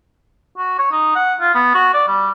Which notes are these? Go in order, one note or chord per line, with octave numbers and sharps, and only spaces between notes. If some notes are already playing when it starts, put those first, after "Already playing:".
F#4
C#5
D#4
F#5
F4
B3
F#4
D5
G3